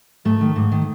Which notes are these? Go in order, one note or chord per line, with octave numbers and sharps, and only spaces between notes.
G#2 A3
D#3
G#2
D#3